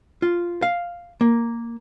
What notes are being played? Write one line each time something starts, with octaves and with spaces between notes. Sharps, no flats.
F4
F5
A#3